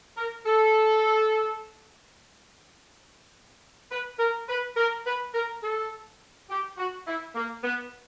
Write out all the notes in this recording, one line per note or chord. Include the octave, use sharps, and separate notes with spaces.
A#4
A4
B4
A#4
B4
A#4
B4
A#4
A4
G4
F#4
E4
A#3
B3